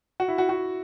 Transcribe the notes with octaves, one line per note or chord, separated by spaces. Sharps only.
F#4
E4
F#4
F#4